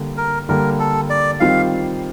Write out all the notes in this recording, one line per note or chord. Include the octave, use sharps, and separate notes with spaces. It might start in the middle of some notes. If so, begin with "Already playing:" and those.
Already playing: D3 G3 A#3
A#4
D3 G3 A#3 A#4
A4
D5
D#3 G3 C4 F4 F5